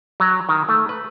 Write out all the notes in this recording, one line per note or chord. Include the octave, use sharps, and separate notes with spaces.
F#3
D#3
A3
B4